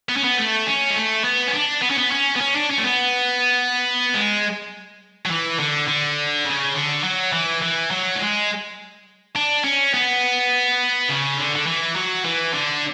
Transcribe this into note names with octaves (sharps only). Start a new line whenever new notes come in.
B3
C#4
B3
A3
C#4
G#3
A3
B3
C#4
D4
B3
C#4
B3
C#4
B3
C#4
D4
C#4
A3
B3
G#3
F#3
E3
D3
D3
C#3
D3
F#3
E3
E3
F#3
A3
G#3
D4
C#4
B3
C#3
D3
D3
E3
F#3
E3
D3